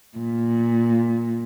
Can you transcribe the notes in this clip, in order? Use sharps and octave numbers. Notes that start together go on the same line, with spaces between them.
A#2